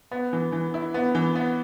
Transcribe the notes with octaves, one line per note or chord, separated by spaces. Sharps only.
B3
E3
E3
E4
B3
E3
B3